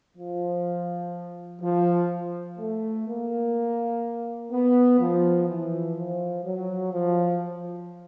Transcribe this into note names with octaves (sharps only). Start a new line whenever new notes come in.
F3
F3
A3
A#3
B3
F3
E3
F3
F#3
F3